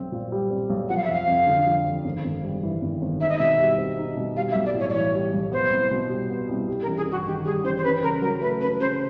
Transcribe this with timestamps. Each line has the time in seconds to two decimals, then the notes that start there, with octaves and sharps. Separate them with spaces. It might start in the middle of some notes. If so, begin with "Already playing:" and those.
Already playing: B1 C4
0.12 A#2
0.32 G3
0.50 C4
0.70 B1
0.89 F3 F#5
0.97 F5
1.04 E5
1.08 F1 F5
1.27 F2
1.47 D3
1.66 F3
1.86 F1
2.05 G#1
2.25 G#1
2.43 G2
2.63 E3
2.82 G#1
3.02 G#1
3.20 D#4 E5
3.29 D#5
3.38 B2 E5
3.60 G3
3.78 C4
3.98 D#4
4.17 B2
4.36 G3 F5
4.51 E5
4.55 B1
4.65 D5
4.74 A2
4.80 C#5
4.90 D5
4.94 E3 C#5
5.14 G3
5.33 B1
5.52 B3 C5
5.71 C2
5.91 B2
6.09 G3
6.30 B3
6.49 C2
6.68 G3
6.82 A#4
6.87 A1
6.97 G#4
7.06 G2
7.12 F#4
7.26 D#3 G4
7.45 G3 G#4
7.64 A1 C5
7.77 C5
7.84 C#4 B4
8.03 C#3 A#4
8.22 F#3 A#4
8.41 A3 B4
8.61 C#4 B4
8.81 C#3 C5